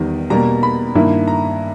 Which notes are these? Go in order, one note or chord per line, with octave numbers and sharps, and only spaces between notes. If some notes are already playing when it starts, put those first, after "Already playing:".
Already playing: E2 D#3 G3
B2 G3 A#3 A#5
B5
G2 D#3 A#3 E4
A#5